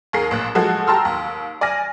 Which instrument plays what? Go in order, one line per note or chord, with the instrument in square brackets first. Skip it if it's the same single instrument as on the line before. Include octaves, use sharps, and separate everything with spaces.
[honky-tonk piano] D#2 G#4 A#4 C7
A#1 A#2 F#6
F3 G#3 F#4 A4
G4 A5 A#5 C6 E6 F6
D#2
D5 G#5 F6 A#6